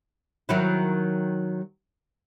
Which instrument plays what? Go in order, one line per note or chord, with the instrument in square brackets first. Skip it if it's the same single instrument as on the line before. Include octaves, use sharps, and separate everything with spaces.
[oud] D#3 F#3 E4